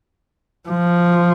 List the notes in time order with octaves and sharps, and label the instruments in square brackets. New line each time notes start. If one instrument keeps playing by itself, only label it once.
[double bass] F3